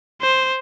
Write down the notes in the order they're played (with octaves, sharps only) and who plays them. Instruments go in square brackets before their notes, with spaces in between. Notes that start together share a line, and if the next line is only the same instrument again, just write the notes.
[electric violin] C5